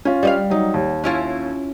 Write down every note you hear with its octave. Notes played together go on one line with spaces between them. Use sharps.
C#4 F4
G3 D#5 F5
F#3 D#4
D#2
C#4 E4 F4